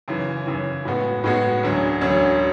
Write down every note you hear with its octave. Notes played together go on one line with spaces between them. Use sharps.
F#2 C#3 E3
F#2 C#3 E3
A2 G#3 B3 F#4
A2 G#3 B3 F#4
E1 D2 D3 F#3 C#4
E1 D2 D3 F#3 C#4